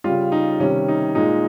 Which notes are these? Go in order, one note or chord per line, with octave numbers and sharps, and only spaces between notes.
C#3 G3 F4
D#4
C3 D#3 G3 C#4
D#4
A#2 G#3 D#4